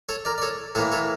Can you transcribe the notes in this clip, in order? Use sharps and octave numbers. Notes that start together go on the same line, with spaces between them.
A4 C#5
A#4 D5
D5
A4 C#5
A2 E3 A#3 A4 C#5
A4 C#5